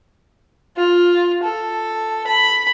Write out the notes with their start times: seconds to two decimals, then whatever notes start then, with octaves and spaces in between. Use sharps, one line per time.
0.77 F4
1.43 A4
2.27 B5